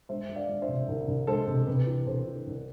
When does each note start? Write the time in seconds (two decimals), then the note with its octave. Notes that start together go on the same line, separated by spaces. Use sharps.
0.09 G#3 C5 E5
0.29 G#3
0.36 D5 F5
0.49 G#3
0.62 C5 E5
0.68 C3
0.88 C2
1.08 C2
1.27 G#3 A4 C5
1.48 C3
1.67 C3 B4
1.87 E3
2.07 C3 A4 C5
2.27 E3
2.47 C2